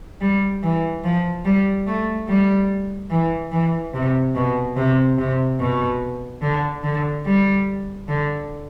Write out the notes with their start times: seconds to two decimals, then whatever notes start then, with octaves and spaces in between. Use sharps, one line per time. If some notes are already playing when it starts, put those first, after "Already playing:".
0.21 G3
0.62 E3
1.04 F3
1.45 G3
1.87 A3
2.28 G3
3.10 E3
3.52 E3
3.93 C3
4.35 B2
4.76 C3
5.18 C3
5.60 B2
6.42 D3
6.83 D3
7.25 G3
8.08 D3